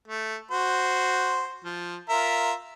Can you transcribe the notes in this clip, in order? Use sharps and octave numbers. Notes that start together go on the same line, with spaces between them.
A3
F#4 C5
F3
F4 A#4 E5